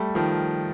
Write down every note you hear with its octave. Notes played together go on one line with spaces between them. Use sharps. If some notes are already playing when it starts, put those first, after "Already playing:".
Already playing: G3 A3
D#3 F3